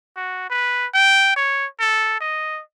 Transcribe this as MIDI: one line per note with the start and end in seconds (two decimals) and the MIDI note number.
0.16 0.46 66
0.50 0.87 71
0.94 1.36 79
1.36 1.66 73
1.80 2.20 69
2.21 2.61 75